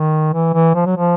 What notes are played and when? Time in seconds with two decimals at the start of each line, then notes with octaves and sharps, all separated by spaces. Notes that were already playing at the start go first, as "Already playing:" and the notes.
Already playing: D#3
0.34 E3
0.54 E3
0.75 F3
0.86 F#3
0.97 F3